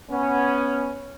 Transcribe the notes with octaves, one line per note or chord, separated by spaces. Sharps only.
B3 C#4